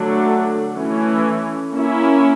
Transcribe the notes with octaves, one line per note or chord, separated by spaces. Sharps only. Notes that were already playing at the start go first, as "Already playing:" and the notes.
Already playing: D3 F#3 A3 D4
E3 A3 C#4
A#3 C#4 E4